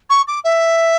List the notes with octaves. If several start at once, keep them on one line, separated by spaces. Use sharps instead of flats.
C#6
D6
E5